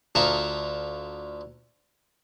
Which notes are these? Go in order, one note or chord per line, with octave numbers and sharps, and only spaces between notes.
D2 F4 A4 A#4 E5 D#6